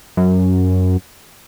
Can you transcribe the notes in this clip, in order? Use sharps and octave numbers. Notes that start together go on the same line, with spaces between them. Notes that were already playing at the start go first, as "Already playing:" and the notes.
F#2